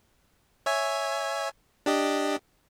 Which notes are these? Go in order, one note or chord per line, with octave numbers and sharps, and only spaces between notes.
C#5 E5 G#5
D4 G4 D#5